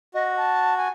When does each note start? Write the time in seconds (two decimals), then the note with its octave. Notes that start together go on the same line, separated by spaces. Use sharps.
0.14 F#4 D#5
0.37 A5
0.77 G#5